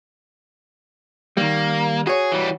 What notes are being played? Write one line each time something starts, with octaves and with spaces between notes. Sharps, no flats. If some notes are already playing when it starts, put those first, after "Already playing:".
D#3 G3 A#3
F#4 G#4 C#5
E3 G3